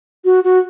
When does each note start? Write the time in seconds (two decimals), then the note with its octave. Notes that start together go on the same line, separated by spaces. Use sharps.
0.25 F#4
0.44 F#4